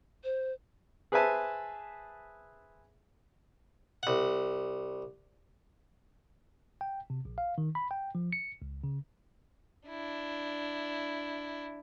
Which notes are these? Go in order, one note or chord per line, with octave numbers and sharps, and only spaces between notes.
C5
G#4 B4 C5 E5 G#5 A5
C2 F#5
G5
C3
A#1
F5
D#3
B5
G5
F3
C#7
C#2
C#3
D4 E4